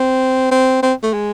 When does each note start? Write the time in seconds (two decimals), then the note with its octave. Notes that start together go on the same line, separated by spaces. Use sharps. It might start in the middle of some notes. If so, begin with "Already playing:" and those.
Already playing: C4
0.51 C4
0.83 C4
1.03 A3
1.14 G#3